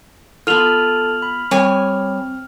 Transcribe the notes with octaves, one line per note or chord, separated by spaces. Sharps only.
B3 F4 A4 A5 F6 F7 F#7
B5
G3 C4 C#5 G#5